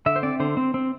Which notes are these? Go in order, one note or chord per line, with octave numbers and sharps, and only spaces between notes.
D3 E5
C5
C4 D5
D3 C5
C4
C4